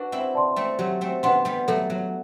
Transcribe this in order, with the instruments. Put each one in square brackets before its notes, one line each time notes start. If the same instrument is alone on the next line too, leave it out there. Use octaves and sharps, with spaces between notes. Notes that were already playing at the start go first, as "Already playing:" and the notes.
Already playing: [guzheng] D4 F#4 [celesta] B4
[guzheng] C4 E4
[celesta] D5 A5 C6
[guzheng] A3 C4
[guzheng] F#3 A3 [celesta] G4
[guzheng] A3 C4
[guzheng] B3 D4 [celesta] B4 F#5 C6
[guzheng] G3 B3
[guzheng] F#3 A3 [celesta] A4
[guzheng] F#3